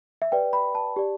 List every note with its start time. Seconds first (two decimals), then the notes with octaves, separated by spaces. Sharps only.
0.22 E5
0.32 G4 B4 D5 G5
0.53 B5
0.75 A5
0.96 G4 D5